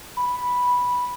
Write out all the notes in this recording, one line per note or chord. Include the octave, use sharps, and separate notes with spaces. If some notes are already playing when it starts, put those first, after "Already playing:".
B5